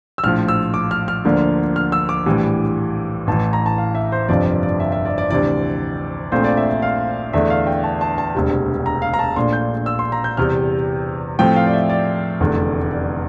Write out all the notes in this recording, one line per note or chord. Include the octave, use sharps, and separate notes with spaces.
E6
A#1 A2 F3 F6
E6
D6
F6
F6
D2 D3 F3 A#3 D4
F6
E6
D6
A#1 A2 E3 G3
A1 A2 E3 A5
A#5
A5
F5
E5
C5
G1 F2 C3 F3 D5
D5
D5
E5
E5
D5
D5
D2 C3 E3 D5
A#1 A#2 A3 C4 C5
D5
E5
E5
F5
E2 D3 A3 D4 E5
F5
G5
A5
A5
A5
E1 D2 C3 G3
A#5
F5
A#5
A5
A#1 A#2 A3 D4 C6
G6
E6
C6
A#5
G6
E2 C3 G3 F6
A2 F3 A3 C4 G5
F5
D5
E5
D5
F1 E2 D3 A3
D5